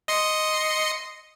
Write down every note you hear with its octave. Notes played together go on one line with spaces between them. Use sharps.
D#5 C6 C#7